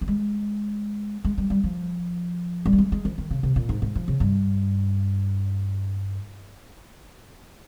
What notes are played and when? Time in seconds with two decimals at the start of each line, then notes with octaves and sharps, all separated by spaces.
0.01 A#3
0.08 G#3
1.25 G#3
1.38 G3
1.50 G3
1.64 F3
2.66 G3
2.73 A#3
2.78 G#3
2.92 G#3
3.05 F3
3.18 D#3
3.31 C#3
3.43 C3
3.56 A#2
3.69 G#2
3.82 G#2
3.95 F3
4.08 C#3
4.20 G2